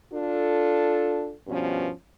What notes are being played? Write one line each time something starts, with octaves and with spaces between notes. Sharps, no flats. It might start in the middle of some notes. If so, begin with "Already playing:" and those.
D4 F4 A4
G2 B2 F3 C#4